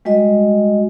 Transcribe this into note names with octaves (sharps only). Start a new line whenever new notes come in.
G3 G#3 F#4 D#5